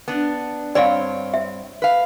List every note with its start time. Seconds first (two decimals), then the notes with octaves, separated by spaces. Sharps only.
0.08 B3 D4
0.75 G2 C4 C#5 D5 F5
1.34 E5
1.82 B4 F5